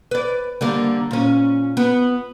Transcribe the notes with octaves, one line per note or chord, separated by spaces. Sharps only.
B4 D5
D3 G3 A#3
A#2 C#4
B3